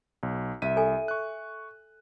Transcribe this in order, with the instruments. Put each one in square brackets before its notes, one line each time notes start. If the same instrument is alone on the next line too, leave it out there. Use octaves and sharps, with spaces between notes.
[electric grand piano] B1
[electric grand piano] C2 D#7 [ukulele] E5
[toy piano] A4 G#5
[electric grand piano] C#6 F#6